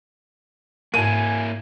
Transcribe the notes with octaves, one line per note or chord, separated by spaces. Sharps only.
G#2 A#3 E4 A#4 G#5 D#7